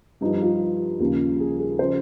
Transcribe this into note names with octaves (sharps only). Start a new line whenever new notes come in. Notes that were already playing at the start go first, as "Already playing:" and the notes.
G2 F3 D#4
D#4
F4
D#2 C#3 F3
G#4
G#4
C#3 F3 C5